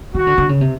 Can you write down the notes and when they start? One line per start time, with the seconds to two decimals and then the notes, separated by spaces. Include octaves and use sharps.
0.15 D#3 F#4
0.27 D3
0.38 D3
0.49 C#3
0.61 C3